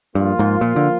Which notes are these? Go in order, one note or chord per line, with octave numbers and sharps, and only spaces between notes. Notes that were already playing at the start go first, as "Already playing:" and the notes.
G2 F3 A#3 F4
G#2
A#2
D3